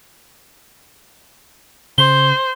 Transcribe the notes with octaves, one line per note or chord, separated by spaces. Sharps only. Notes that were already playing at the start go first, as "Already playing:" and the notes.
C#3 C5 G7